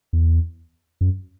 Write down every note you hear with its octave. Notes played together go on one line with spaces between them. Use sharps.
E2
F#2